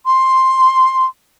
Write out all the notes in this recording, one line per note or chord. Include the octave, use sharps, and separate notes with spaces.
C6